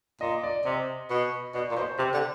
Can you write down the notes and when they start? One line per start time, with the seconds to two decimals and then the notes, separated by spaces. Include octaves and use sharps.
0.21 A#2 D#5
0.43 D5
0.65 C3 D#5
1.10 B2
1.54 B2 D5
1.71 A#2
1.76 B2 C5
1.98 C3 G4
2.14 D3